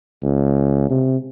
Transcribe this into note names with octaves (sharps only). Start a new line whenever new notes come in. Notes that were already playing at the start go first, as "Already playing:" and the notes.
C#2
C3